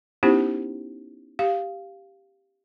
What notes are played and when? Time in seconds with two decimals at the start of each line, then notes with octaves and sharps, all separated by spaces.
0.23 B3 C#4 D#4 E4 G4 C5
1.39 G4 F5